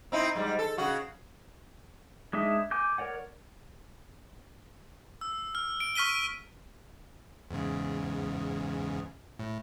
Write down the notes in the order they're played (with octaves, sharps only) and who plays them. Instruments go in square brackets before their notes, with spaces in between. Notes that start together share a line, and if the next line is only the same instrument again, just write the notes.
[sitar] C4 D#4 E4
G#2 G3
A4
C#3 F#4
[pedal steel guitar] G#3 D4 D#4 E5
G#5 D6 G6
A#4 C#5 D5 F#5
[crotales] E6
F6
D7
C#6 F6 B6 D#7 G7
[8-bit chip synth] E2 G#2 C#3
A2